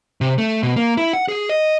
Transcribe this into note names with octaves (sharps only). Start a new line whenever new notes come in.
C3
A3
B2
A#3
E4
F#5
G#4
D#5